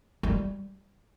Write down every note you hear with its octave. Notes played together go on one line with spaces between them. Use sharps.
G3